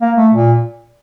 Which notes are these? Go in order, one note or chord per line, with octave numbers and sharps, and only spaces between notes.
A#3
A3
A#2